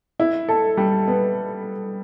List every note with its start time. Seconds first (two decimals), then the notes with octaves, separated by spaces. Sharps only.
0.20 E4
0.49 A4
0.77 G3
1.08 B3